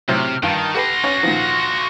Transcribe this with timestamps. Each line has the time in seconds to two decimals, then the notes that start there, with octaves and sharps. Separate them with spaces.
0.08 A2 C3 F#3 C5 F6
0.43 G2 D#3 F4 A5
0.75 F#4 G4 A4 B4 C6 A#6
1.04 C#4 C#5
1.23 A#2 D#3 F3